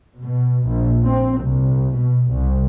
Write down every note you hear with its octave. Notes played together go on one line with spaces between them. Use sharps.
B2
A#1
C4
C2
B2
C2